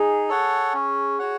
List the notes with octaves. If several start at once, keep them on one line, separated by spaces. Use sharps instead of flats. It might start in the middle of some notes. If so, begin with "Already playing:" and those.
Already playing: D#4 G#4
A4 C#5 F#5
C#4
F#4 C#5 F#5